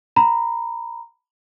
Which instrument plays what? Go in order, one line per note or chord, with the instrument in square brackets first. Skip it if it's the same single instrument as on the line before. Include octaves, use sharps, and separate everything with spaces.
[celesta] A#5 B5